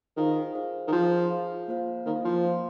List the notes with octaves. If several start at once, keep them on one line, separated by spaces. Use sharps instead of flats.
D#3 F4 G#4 C5 F5
F4 G#4 C5 F5
D#3
F3 F4 G#4 C5 F5
F4 G#4 C5 F5
A#3 F4 C5 F5
D#3 A#3 F4 C5 F5
F3
A#3 F4 C5 F5